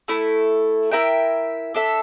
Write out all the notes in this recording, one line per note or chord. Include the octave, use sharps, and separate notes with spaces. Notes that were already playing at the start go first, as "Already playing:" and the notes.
A3 E4 A4
E4 A#4 E5 G5
D4 A4 E5